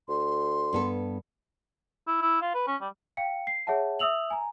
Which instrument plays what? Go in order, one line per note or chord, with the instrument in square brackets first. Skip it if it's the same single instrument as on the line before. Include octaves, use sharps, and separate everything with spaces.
[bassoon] D2 [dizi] C6
[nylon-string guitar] G2 B3 A4
[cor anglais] E4
E4
F4
B4
C#4
G3
[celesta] F5 G5 C#7
C7
G#4 C#5 E5 F#5 A5
E5 D#6 E6 F7 F#7
G#5 A#5